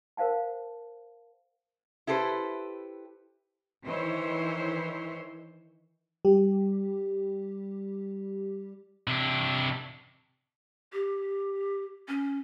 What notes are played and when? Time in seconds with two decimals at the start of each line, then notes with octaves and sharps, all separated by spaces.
0.17 A#4 C5 F5 F#5 A5
2.07 E4 G4 A4 B4 C5
3.84 D#3 E3 E4 C5 C#5
6.25 G3 G4
9.08 C3 D4
10.93 G4
12.08 C#4